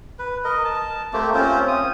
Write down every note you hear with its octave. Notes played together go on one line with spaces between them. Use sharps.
B4
A#4 D#5
A5
A3 A#3 C4 G4
C4 C#4 F4 C5
D#6